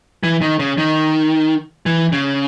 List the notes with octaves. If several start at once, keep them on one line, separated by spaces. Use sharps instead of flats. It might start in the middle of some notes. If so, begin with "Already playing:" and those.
E3
D#3
C#3
D#3
E3
C#3